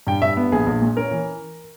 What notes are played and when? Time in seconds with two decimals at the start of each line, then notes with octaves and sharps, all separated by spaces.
0.07 G2 G5
0.22 G2 E5
0.37 B3
0.52 A#1 G#4
0.67 A#1
0.82 A#2
0.97 C#4 A#4
1.11 E3